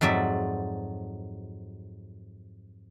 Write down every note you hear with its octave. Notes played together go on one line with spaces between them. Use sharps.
F2 G#2 F#3 D5 E5